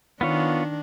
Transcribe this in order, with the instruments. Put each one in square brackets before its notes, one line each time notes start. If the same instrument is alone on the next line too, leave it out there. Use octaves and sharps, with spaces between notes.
[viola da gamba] D#3 D4 [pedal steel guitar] B3 F4 C#5